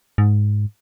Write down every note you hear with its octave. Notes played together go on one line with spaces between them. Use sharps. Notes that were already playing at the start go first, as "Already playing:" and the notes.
G#2